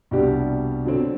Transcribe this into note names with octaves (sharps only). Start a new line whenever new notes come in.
C2 B2 G3 D4 G4
D3 F#3 C4